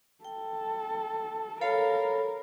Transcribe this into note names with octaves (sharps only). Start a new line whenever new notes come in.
A4 G5
A4 A#4 C#5 F5 B5